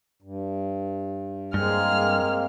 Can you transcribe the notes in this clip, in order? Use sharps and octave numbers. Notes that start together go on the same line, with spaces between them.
G2
G2 G#3 A#3 C4 G#4 F6